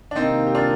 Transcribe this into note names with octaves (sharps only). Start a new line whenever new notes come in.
D4
C3 D#3 A#3 C4 D#4
G4
D4 F4